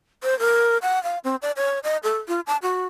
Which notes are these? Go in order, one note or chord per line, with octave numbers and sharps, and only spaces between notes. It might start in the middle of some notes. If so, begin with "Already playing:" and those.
C5
A#4
F#5
F5
C4
D5
C#5
D#5
A4
F4
A5
F#4